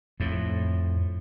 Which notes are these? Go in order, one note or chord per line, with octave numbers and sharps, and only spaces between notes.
F2 A2